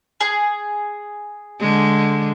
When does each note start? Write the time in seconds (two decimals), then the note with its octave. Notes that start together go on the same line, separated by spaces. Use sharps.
0.21 G#4
1.60 D3 G#3